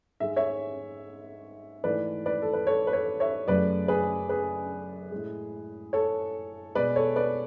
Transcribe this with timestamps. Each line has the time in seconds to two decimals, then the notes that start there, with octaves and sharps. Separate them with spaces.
0.20 G#2 G#3 E5
0.36 C#5 E5
1.84 G#2 E3 A3 B4 D5
2.26 B4 D5
2.42 A4
2.53 B4
2.67 A4 C#5
2.87 B4
2.93 A4 C#5
3.20 C#5 E5
3.47 F#2 C#3 F#3 A3 B4 D5
3.88 G#4 B4
4.29 G#4 B4
5.11 A2 G#3
5.93 A4 C#5
6.75 B2 G#3 B4 D5
6.96 A4 C#5
7.16 B4 D5